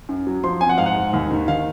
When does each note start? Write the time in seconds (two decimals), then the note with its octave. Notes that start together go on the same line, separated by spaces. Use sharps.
0.09 F#2
0.27 F#3
0.44 F3 C6
0.61 C4 G#5
0.69 F#5
0.78 G#2 F5
0.86 F#5
0.96 G#2
1.13 D#2
1.31 D#3
1.48 D#3 F5